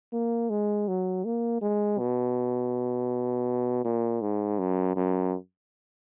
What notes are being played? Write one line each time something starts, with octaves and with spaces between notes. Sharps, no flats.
A#3
G#3
F#3
A#3
G#3
B2
A#2
G#2
F#2
F#2